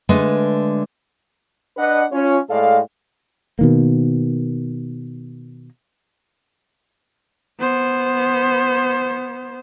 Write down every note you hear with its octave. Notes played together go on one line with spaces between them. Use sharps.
D3 G#3 A3 B4
D4 B4 D#5 F#5
C#4 F4 C#5
A2 G#3 A4 D5 F5
B2 D#3 A#3
B3 C5